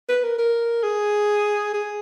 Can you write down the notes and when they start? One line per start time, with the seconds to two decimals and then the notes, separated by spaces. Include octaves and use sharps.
0.09 B4
0.24 A#4
0.38 A#4
0.83 G#4
1.74 G#4